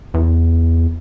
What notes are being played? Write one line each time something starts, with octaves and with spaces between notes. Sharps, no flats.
E2